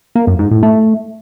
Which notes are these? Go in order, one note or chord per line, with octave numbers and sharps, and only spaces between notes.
A#3
F#2
G#2
A2
A3